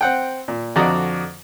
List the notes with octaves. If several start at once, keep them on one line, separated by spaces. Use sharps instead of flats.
C4 F#5 G5
A#2
F2 D3 F#4 D5 D#5 A#5